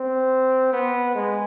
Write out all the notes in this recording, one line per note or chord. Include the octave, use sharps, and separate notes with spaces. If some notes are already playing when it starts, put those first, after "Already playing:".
Already playing: C4
B3
G#3